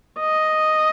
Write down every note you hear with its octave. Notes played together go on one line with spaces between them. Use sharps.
D#5